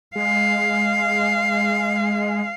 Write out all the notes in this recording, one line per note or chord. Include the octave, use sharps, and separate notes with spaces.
G#3 F5